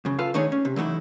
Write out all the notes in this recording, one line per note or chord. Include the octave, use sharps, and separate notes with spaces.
F#2 C#3
F4 A4 B4 F5
D#3 A3 D4 D#4 G#4 C#5
C#4
C3
E3 F#3 A3 D#4 E4